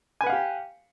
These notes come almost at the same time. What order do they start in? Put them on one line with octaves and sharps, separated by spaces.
G#5 B4 F#5 F5 G4